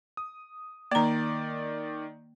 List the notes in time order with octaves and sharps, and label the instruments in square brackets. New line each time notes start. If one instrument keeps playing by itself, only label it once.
[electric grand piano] D#6
[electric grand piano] D#3 D5 [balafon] A#3 A#5